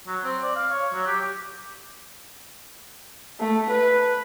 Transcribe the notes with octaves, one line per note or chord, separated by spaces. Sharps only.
F#3
C4
D5
F5
C#5
F#3
G4
A3
B4